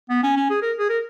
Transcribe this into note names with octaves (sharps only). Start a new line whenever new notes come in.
B3
C#4
C#4
G#4
A#4
G#4
A#4